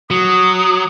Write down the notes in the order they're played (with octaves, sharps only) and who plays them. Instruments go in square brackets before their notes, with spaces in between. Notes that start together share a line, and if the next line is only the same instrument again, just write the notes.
[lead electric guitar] F#3 [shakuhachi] D#6